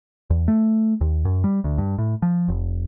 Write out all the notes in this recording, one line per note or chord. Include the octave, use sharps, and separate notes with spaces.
E2
A3
D#2
F#2
G3
D2
G2
A2
F3
F1